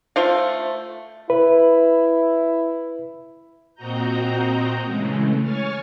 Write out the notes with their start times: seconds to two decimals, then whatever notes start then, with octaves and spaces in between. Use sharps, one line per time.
0.16 A3 F4 C5 F5
1.30 E4 B4
3.75 A#2 C4 F#4 D#5 A#5 G6
4.86 C#3 E3 G#3 A3
5.41 C#5 G#5 C#6 F6 A6